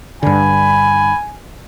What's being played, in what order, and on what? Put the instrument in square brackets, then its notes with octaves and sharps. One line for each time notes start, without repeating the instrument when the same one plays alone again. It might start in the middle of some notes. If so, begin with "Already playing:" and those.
[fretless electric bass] G2 D3 [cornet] G#5 [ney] B5